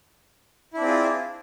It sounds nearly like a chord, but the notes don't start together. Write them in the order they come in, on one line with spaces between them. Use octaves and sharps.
E4 D4 C4 G#4 F4